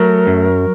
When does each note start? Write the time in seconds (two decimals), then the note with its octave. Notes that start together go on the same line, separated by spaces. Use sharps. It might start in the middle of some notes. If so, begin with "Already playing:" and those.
Already playing: F#3 A3 A#4
0.27 F#2